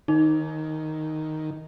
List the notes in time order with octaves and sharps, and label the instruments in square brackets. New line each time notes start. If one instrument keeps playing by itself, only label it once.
[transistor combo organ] D#3 [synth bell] D#4